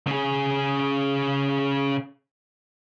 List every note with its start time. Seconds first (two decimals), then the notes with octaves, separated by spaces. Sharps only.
0.07 C#3 G#4